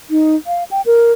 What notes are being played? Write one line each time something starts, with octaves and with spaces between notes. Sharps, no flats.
D#4
F5
G5
A#4